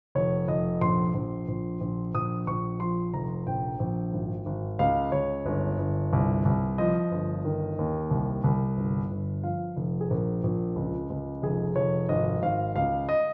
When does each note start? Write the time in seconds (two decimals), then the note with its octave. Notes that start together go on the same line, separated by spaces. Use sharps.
0.15 F1 C#5
0.48 F1 D#5
0.81 A#1 C6
1.14 A#1
1.48 A#1
1.81 A#1
2.14 A#1 D#6
2.47 A#1 C#6
2.80 F3 C6
3.14 F1 A#5
3.47 A#1 G5
3.80 A#1
4.13 G#1
4.46 G#1
4.79 C#2 F5
5.12 C#2 C#5
5.46 G1
5.79 G1
6.13 C2
6.45 C2
6.78 F3 D#5
7.12 G1
7.45 D#3
7.79 D#2
8.11 C2
8.44 C2
8.77 G1
9.11 G1
9.44 F3 F5
9.77 F1
10.01 G#4
10.10 A#1 A#4
10.44 A#1
10.76 C#2
11.10 C#2
11.42 F1 G#4
11.76 F1 C#5
12.09 G#1 D#5
12.43 G#1 F5
12.76 C#2 F5
13.09 D#5